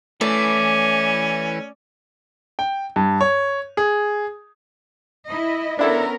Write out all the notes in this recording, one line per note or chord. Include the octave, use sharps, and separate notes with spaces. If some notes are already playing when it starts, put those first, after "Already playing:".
E3 A3 C#4 D5
G5
G2
C#5
G#4
E4 D#5
B3 C#4 D4 E4 A4 A#4